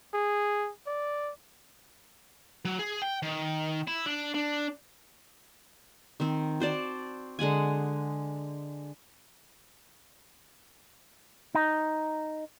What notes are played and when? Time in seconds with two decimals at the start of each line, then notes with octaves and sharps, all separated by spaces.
0.14 G#4
0.87 D5
2.65 F#3
2.79 G#4
3.02 G5
3.22 D#3
3.87 E4
4.06 D4
4.35 D4
6.20 D#3 C4
6.60 F#4 C5 D5 A5
7.39 D3 G#3 F#5 G#5
11.55 D#4